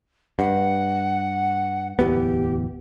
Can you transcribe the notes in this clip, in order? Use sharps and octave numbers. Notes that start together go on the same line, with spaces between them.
G2 F#5
D1 E2 B3 G4